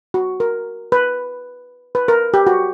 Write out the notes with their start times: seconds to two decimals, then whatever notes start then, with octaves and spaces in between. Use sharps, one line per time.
0.14 F#4
0.40 A#4
0.92 B4
1.95 B4
2.08 A#4
2.34 G4
2.47 F#4